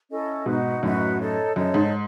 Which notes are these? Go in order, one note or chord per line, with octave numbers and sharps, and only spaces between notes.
C#4 E4 A4 D#5
G#2 B2 D#4 F#4 B4
F#2 A2 D#4 F#4 B4
D#4 A4 C#5
F#2 D#4 A4 C#5
G#2